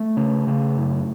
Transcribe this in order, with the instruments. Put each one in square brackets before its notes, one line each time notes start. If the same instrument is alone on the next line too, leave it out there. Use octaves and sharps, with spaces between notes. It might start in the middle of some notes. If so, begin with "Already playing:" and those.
Already playing: [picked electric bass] A3
C#3
C#3
F#2